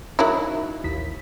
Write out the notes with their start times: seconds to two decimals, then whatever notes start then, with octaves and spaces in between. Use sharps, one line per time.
0.19 D#3 F#3 E4
0.84 A1 D#2 B6